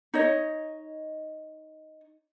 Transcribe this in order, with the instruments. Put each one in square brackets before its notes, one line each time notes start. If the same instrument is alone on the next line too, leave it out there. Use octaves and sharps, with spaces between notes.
[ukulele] D#4 C#5 D#5